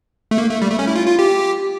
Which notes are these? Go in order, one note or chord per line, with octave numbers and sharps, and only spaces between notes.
A3
A#3
A3
G3
A3
C#4
E4
F4
F4
G4